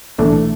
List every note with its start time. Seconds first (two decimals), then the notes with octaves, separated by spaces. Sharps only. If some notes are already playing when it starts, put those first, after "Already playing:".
0.18 B1 A2 E3 A3 D4